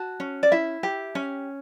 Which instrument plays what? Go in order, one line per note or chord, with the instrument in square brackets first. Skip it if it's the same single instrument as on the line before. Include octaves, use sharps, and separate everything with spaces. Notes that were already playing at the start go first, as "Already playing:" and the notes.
Already playing: [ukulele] F#4 A5
C#4
D5
E4 E5
G4
C#4